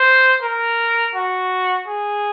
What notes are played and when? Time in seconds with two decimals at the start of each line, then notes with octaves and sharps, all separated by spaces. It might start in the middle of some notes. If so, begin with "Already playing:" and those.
Already playing: C5
0.42 A#4
1.15 F#4
1.87 G#4